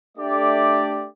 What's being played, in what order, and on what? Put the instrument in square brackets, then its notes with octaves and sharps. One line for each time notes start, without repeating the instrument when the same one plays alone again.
[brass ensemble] A3 D4 G4 D5